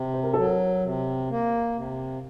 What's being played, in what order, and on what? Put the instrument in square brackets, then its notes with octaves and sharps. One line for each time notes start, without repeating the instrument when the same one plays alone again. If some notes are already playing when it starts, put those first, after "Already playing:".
Already playing: [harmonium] C3
[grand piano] C5
A#4
[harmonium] F#3 [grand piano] A4
[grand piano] A#4
[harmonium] C3
A#3
C3